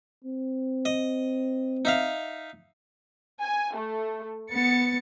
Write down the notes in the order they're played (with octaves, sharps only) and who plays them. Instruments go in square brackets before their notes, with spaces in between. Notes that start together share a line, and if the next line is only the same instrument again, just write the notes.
[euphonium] C4
[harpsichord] D#5
D#4 E5 F5
[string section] G#5
A3
B3 A6 C#7